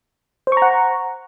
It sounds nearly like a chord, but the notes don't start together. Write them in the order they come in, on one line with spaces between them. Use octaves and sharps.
C5 C#6 A#5 F#5